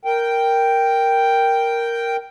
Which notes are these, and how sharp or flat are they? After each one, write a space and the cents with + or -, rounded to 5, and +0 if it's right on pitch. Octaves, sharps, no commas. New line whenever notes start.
A#4 +0 G5 +0